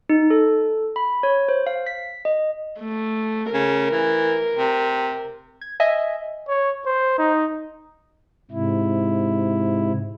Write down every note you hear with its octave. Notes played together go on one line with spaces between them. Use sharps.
D#4
A4
B5
C#5
C5
F5
B6
D#5
A3
C#3 A#4
E3
C3
G#6
D#5 E5 G#5
C#5
C5
D#4
G#2 C3 E4